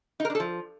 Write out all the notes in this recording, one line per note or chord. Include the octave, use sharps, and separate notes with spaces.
D#4
A#4
D4
A4
F3